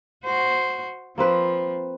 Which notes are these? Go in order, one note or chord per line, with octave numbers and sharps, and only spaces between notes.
F#4 C5
F3 A#3 C4 B4